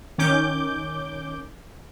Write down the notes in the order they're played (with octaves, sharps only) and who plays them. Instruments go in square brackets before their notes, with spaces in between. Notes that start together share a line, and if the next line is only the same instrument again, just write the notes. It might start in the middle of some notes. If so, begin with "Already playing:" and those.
[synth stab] D#3 C#4 D6 G6